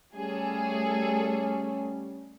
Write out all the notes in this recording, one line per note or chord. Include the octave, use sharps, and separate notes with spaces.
G3 A3 C#4 G#4 A4